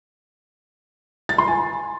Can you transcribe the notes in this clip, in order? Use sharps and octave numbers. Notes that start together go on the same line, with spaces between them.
A6
C6
G#5